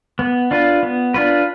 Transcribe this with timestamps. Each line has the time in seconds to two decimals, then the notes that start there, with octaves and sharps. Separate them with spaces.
0.19 B3
0.51 D4 F4 B4
0.83 B3
1.14 D4 F4 B4